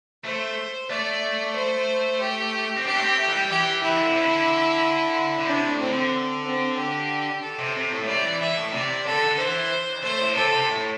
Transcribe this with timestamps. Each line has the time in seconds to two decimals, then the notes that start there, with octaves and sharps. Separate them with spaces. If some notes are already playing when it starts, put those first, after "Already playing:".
0.24 A3 C5
0.90 A3 D5
1.55 C5
2.20 G4
2.76 C4
2.85 D4 G4
2.95 A3
3.02 C4
3.18 A3
3.27 E3
3.34 G3
3.51 E3 G4
3.83 E3 E4
3.96 D3
4.08 C3
4.20 D3
5.39 D3
5.46 C3 D4
5.69 A2
5.79 C4
5.90 D3
6.44 C4
6.78 G4
7.42 A4
7.59 C3
7.75 C3
7.92 A2
8.03 A2
8.08 C3 D5
8.17 G3
8.25 E3
8.41 E3 E5
8.56 A2
8.73 C3 D5
9.06 D3 A4
9.27 D3
9.38 E3 C5
10.03 A3 C5
10.20 A2
10.36 C3 A4
10.53 C3
10.70 A2